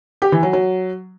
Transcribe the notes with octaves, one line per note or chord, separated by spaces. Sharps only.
G4
E3
F#3
F#3